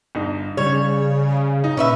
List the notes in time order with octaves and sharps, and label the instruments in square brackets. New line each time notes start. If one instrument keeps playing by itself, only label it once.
[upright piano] G1 D#4
[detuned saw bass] C#3 [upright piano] G3 [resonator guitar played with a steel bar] C#5
[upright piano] D#4
[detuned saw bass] A#2 [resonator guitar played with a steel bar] C#4 B4 E5